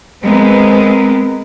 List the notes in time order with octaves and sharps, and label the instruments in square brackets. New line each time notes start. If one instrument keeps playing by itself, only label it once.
[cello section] G#3 B3 C4 A#4 B4